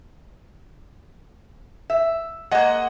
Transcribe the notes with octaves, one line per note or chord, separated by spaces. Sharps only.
E5
G#3 A#3 D#5 F#5